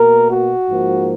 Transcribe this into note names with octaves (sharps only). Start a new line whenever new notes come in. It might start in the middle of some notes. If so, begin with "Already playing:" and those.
Already playing: B2 A#3 A#4
F#4
G#2 F3 A#3